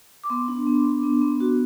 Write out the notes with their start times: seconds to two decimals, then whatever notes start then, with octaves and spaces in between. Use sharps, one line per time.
0.24 D6
0.30 B3 C6
0.48 D4
0.67 B3
0.85 D4
1.03 B3
1.22 B3
1.40 F#4